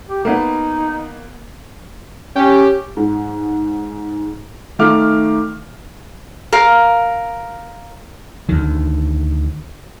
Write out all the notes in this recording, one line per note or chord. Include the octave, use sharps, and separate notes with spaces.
G4
A#3 B3 D#4
C#4 G4
G#2
D#3 A3 D#4 F5 D6 F6
A#4 F5
D2 D#3